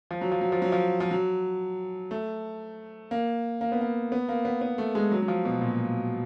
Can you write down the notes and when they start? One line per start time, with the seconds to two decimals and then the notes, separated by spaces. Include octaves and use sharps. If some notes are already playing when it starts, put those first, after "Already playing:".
0.11 F3
0.21 F#3
0.32 F3
0.41 F#3
0.52 F3
0.62 F#3
0.72 F3
1.00 F3
1.11 F#3
2.11 A3
3.11 A#3
3.61 A#3
3.72 B3
3.81 A#3
4.12 B3
4.29 A#3
4.45 B3
4.61 B3
4.78 A3
4.95 G#3
5.11 F#3
5.22 F#3
5.28 F3
5.45 B2
5.61 A#2